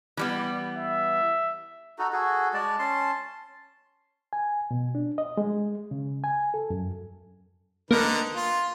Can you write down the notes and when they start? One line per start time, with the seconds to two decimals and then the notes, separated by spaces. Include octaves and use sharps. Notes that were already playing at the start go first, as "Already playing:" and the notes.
0.17 E3 G3 B3
0.77 E5
1.98 D#4 F#4 A4
2.13 F#4 G#4 A4
2.54 G#3 D5 A5
2.79 C#4 A5 C6
4.33 G#5
4.71 B2
4.95 D4
5.18 D#5
5.37 G#3
5.91 C#3
6.24 G#5
6.54 A4
6.70 F#2
7.91 D3 A#3 D#4 B4 A#6
8.36 F4